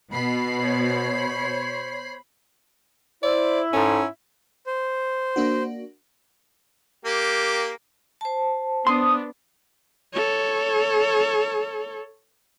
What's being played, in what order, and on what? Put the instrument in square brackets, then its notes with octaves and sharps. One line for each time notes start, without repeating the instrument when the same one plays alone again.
[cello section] B2 [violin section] B5 C7
[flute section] C5 C#5
[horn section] E4 [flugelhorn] C5 [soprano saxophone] D5
[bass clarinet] G#2 [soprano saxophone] C#4 [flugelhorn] A4
[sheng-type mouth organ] C5
[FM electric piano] A#3 D4 F#4
[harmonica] A#3 G4
[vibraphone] C5 A5
[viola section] B3 D4 [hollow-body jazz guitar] C6 [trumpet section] D#6
[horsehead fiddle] A4 C#5